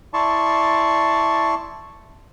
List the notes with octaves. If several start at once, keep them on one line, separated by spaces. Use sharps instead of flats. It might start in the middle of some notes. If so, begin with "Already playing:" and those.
E4 D5 A5 C6 C#6